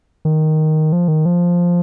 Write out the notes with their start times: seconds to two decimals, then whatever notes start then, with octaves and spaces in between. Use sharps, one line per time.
0.25 D#3
0.93 F3
1.08 D#3
1.26 F3